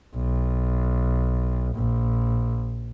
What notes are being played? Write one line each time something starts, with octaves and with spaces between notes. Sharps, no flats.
B1
A#1